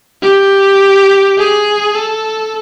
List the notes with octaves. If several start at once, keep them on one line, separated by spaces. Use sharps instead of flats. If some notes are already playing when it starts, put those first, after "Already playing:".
G4
G#4
A4